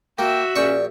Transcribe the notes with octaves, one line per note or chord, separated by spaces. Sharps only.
A#3 F#4 E5 G5
A#1 C#4 D5 G5 C#6